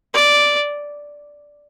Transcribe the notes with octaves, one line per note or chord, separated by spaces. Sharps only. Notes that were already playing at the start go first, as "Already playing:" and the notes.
D5